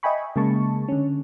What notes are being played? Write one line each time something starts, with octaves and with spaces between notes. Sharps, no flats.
D#5 E5 G5 G#5 B5 C#6
C#3 G#3 A#3 A5 C#6
D3 C#4